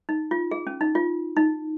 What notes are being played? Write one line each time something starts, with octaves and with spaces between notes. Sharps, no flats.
D#4
F4
G#4
C#4
D#4
F4
D#4